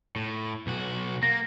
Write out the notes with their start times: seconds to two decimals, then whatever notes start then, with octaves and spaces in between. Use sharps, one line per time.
0.16 A2
0.67 B1 F#4
1.23 A#3 A#6